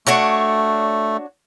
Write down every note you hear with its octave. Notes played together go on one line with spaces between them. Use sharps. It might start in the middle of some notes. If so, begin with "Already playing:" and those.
A3 D4 F#4 C#5